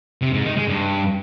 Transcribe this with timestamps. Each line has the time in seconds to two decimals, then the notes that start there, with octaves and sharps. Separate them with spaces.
0.22 C3
0.33 G#2
0.45 D#3
0.56 G#3
0.68 G2